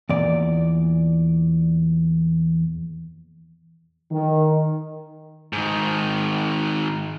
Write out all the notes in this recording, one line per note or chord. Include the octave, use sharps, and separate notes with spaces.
E2 A#2 D5
D#3
G#2 D#3